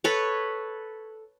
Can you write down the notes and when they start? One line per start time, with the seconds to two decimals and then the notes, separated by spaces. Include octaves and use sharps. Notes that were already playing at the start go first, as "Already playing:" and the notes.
0.04 A4 B4 C#5